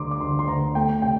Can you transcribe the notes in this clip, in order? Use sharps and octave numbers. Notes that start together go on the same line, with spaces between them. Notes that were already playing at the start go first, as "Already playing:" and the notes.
Already playing: D2 D3 G3 A#5 C6 D6
D6
D2 C6
C6
D2 A#5
A3 G5
C3 G5